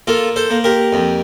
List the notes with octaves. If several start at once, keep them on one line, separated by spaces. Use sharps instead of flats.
A#3 F4 A4
A4 C5
A#3
G4 A#4
F2